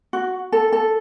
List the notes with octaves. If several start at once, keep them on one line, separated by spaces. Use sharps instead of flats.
F#4
A4
A4